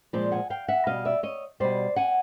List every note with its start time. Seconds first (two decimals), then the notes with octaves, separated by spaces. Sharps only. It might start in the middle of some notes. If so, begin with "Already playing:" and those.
0.13 A#2 F3 G#3 C5 D5
0.32 F#5 G#5
0.50 F5 G5
0.68 E5 F#5
0.87 B2 G3 D#5 F5
1.05 D5 E5
1.23 C#5 D#5
1.60 B2 G3 C5 D5
1.96 F#5 G#5